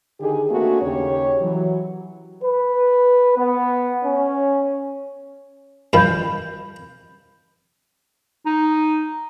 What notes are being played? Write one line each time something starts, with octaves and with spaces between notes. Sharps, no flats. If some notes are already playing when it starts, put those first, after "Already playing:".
D3 D#3 G4 G#4
A3 A#3 C4 D4 F#4 G#4
D#2 C#3 C#4 G4 C#5
E3 F#3
B4
B3
C#4
G2 D#3 F3 B5 G6
D#4